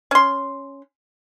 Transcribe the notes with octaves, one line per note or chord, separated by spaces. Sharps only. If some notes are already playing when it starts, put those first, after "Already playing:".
C#4 C6